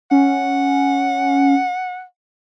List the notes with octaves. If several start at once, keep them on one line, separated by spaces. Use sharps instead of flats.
C#4 F#5